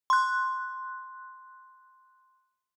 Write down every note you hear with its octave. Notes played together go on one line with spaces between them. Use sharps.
C6 F#6